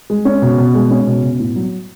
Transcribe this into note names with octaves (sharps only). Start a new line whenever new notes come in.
G#3
C#4
B2
B2
G#3
C#4
B2
B2
A2
F#3